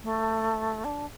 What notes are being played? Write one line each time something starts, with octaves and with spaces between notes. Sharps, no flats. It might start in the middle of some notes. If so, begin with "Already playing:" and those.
A3
D4